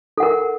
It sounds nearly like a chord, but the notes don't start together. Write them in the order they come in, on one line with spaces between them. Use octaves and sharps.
A4 F#5 A#4